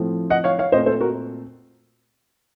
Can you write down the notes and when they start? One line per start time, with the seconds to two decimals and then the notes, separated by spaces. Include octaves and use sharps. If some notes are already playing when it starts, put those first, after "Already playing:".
Already playing: A2 F3 A3 C4
0.30 D#5 F#5
0.44 C#5 F5
0.58 C#5 F5
0.72 A#2 A3 C4 C5 D#5
0.86 A4 C5
1.01 F#4 A#4